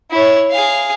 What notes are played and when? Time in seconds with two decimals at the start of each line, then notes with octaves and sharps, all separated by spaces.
0.11 E4 C#5
0.52 G#4 F5